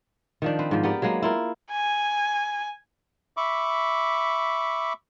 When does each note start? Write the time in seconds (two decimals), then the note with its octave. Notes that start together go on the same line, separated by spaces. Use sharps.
0.42 D#3 F3 D4
0.59 C4 B4
0.71 G#2 F3
0.83 B3 G4 A#4 D5
1.02 F#3 G#3 A#3 B3
1.22 E4 F4 A#4
1.72 G#5
3.37 E5 B5 C#6 D6